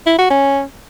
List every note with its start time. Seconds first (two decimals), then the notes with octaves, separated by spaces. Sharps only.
0.06 E4
0.18 F#4
0.30 C#4